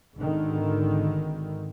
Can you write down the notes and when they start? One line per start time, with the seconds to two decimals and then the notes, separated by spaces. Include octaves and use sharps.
0.18 G#1 D3 D#3